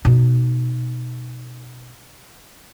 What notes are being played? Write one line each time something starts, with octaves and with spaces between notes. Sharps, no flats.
B2 D#4